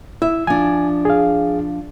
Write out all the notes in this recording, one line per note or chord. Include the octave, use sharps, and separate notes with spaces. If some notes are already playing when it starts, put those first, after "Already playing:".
E4 E5
F3 D4 G#5
G#4 F5